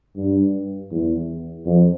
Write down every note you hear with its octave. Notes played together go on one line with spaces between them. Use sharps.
G2
E2
F2